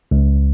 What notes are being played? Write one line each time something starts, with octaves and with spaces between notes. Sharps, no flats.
C#2